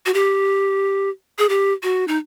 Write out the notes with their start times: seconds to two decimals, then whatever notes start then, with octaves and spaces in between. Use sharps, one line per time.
0.06 F#4
0.14 G4
1.39 G#4
1.49 G4
1.83 F#4
2.08 D#4